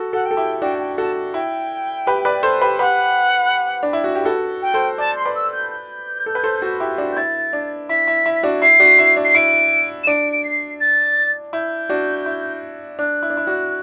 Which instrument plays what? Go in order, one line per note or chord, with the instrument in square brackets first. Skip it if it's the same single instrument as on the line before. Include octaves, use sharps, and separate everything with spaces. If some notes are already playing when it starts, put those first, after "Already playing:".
Already playing: [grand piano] F#4 A4
[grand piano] F#4 A4 [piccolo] F#5
[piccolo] G5
[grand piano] A4
E4 G4
[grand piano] D4 F#4 [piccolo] G5
[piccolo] G5
[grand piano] F#4 A4 [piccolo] A5
[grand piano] E4 [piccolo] G5
[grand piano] G4 B4
B4 D5
A4 C5
G4 B4
[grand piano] G4 B4 [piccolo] F#5
[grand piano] D4
E4
F#4
G4
F#4 A4
[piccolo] G5
[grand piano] A4 C5
[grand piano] D5 [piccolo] A5
[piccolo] C6
[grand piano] B4 D5
[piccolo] E6
G6
G6
[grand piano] A4
B4
A4 C5
F#4 A4
E4 G4
D4 F#4
[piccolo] G6
[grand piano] E4 [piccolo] A6
[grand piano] D4
[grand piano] E4 [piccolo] B6
[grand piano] E4
E4
D4 F#4
[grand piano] E4 [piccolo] C7
[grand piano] D4 F#4
E4
D4
[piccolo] C7
[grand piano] E4 [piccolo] D7
[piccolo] E7
[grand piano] D4 [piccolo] D7
[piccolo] D7
C7
A6
[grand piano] E4 [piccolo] G6
[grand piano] D4 F#4
E4
[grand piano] D4 [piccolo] F#6
[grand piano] E4
D4
E4
D4 F#4